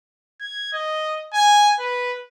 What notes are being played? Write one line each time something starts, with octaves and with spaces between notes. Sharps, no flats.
G#6
D#5
G#5
B4